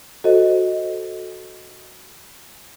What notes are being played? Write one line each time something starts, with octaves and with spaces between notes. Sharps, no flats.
F#4 A4 C5 D#5